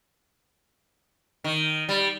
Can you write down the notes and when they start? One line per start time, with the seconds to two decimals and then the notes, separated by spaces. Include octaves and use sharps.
1.44 D#3
1.89 G3